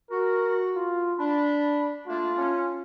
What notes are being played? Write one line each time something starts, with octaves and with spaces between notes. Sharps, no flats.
F#4 A#4
F4
D4 B5
A3 A#3 D4 F4
C#4